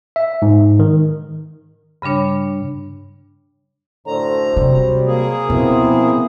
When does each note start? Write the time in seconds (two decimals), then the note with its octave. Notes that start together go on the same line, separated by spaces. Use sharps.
0.16 E5
0.42 G#2
0.79 D#3
2.02 G2 C#3 G3 D4 C#5
4.07 F#2 A2 D3 C5 A#5
4.56 C3 F#3 G3
5.06 A#3 G#4
5.50 B2 F3 B3 C4 E4